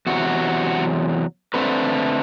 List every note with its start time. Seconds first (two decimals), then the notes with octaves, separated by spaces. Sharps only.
0.07 E2 C3 F#3 F#4
1.54 D3 A3 C4 B4